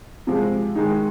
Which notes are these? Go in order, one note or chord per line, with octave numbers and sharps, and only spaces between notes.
C3 F3 G#3
G#2 D#3 G#3 D#4